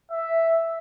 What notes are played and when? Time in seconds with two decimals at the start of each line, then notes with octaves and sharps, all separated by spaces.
0.11 E5